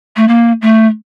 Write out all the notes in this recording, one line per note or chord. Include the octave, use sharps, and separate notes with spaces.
A3
A#3
A3